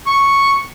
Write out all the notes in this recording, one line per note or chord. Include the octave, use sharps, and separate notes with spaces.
C#6